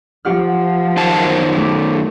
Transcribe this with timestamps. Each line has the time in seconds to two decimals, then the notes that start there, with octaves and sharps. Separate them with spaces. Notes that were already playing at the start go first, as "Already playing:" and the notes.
0.25 F3 G4 F#5 F6
0.97 F#2 D#3 C5 A5
1.57 A3 D6